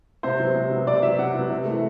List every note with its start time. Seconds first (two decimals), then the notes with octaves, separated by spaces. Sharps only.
0.23 C3 C5
0.40 F#3 B3
0.55 C3
0.71 F#3 B3
0.87 C3 D5
1.02 F#3 B3 E5
1.19 C3 F#5
1.35 F#3 B3
1.50 C3
1.65 E3 A3